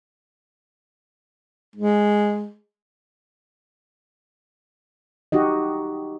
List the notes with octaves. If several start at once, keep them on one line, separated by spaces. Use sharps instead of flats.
G#3
D#4 F#4 G4 D#5